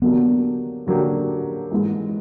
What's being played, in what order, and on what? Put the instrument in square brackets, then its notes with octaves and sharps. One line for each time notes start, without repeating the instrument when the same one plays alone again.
[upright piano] D3 F#3 A#3 D4 G4 [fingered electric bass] B3
[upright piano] D3 F#3 A#3 D4 G4
G#2 E3 G#3